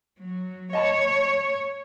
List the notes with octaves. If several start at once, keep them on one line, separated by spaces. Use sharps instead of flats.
F#3
C#5 D#5 A5 B5